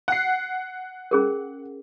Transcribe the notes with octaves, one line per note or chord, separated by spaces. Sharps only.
F#5 C7
C#4 G#4 A#4